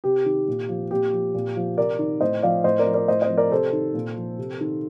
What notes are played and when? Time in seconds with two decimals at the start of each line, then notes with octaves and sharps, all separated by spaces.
0.04 C3 G4
0.26 D#3
0.48 A#2
0.69 F3
0.91 A#2 G4
1.13 F3
1.34 A#2
1.56 F3
1.77 C3 A#4 D5
1.99 D#3
2.21 A2 C5 D#5
2.43 F3 D5 F5
2.64 A2 C5 D#5
2.79 A#4 D5
2.86 F3
2.94 A#4 D5
3.08 A2 C5 D#5
3.22 C5 D#5
3.29 F3
3.37 A#4 D5
3.51 C3 A4 C5
3.73 D#3
3.94 A#2
4.16 F3
4.38 C3
4.61 D#3